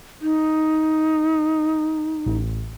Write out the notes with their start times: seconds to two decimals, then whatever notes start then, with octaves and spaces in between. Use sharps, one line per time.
0.21 D#4
2.26 A1